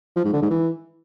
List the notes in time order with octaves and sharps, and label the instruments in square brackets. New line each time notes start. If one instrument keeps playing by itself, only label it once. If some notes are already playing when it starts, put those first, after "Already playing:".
[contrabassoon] F3
G#2
D3
G#2
E3